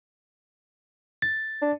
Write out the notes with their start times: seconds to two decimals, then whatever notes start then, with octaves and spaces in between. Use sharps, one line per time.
1.22 A6
1.62 D4